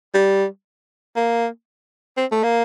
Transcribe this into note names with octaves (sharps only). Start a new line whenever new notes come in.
G3
A#3
C4
A3
A#3